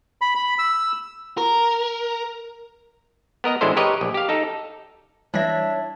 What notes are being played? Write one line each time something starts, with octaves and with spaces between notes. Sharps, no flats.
B5
B5
E6
A#4
B3 A#4 D#5 A#5
A1 G#3 D4 E4 A4 C5
G4 A#4 B4 C#5 D#5
A#1
G4 F5
D#4 A4
E3 G3 D4 E4 C#5 E5 A#6